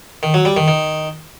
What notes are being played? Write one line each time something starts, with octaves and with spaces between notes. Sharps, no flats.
D#3
F#3
G3
D#3
D#3